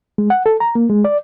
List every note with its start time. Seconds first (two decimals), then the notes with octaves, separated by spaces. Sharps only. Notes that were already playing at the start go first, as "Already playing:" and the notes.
0.18 G#3
0.30 F#5
0.46 A4
0.60 A#5
0.75 A#3
0.90 G#3
1.05 D5